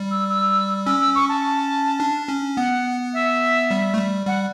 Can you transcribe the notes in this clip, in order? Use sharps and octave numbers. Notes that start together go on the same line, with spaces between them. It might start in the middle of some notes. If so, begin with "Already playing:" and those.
Already playing: G3
E6
E6
C#4 E6
E6
C#6
A5
D4
C#4
B3 F#5
E5
G3
A3
G3
G3 F#5